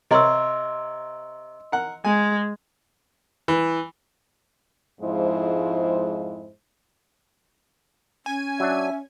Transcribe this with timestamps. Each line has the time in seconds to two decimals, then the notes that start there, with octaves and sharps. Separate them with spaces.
0.11 C3 A#4 C#5 D#5 C6 E6
1.72 A#4 F#5
2.05 G#3 G#5
3.48 E3
5.01 F2 G#2 F3 G#3 E4 C5
8.26 C#4 G#5
8.60 F#3 D4 E5